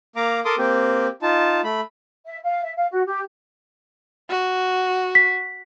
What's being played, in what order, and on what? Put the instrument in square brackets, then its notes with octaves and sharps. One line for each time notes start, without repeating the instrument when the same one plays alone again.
[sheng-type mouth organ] A#3 F5 A#5 D6
A4 A#4 C6 D6 D#6
A#3 C4 G4
D#4 F4 A5
A3 B5
[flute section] E5
F5
E5
F5
F#4
G4
[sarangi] F#4
[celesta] B6